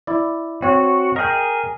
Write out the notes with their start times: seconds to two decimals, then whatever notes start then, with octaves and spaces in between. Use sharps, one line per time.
0.07 E4 D5
0.62 C4 F#4 C#5
1.16 G#4 A#4 D#5 G5